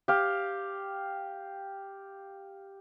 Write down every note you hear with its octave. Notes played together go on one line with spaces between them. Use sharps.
G4 F5